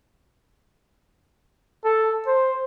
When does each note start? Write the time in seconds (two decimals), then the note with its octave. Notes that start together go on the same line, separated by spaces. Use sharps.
1.84 A4
2.27 C5